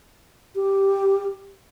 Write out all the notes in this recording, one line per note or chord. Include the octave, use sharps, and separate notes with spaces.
G4